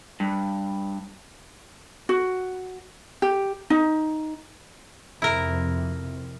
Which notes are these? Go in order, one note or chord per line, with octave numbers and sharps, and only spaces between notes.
G2
F#4
G4
D#4
F2 C3 E4 A#4